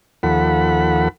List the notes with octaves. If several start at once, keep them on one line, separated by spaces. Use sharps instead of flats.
D#2 F3 A4 F#5 B5